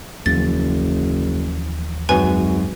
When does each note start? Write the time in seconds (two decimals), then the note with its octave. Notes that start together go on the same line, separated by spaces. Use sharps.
0.26 F#1 D#2 E3 F3 A6
2.09 G#1 F#2 B4 G#5